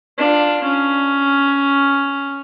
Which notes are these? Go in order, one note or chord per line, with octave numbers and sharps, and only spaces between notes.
D4 F4
C#4